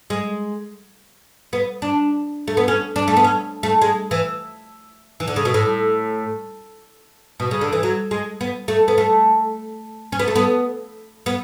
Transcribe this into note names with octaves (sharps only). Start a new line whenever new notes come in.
G#3
B3
D4
A3
B3
C#4
D4
A3
B3
C#4
A3
G#3
E3
E3
D3
C#3
B2
A2
B2
C#3
D3
E3
F#3
G#3
B3
A3
B3
A3
C#4
B3
A3
B3
B3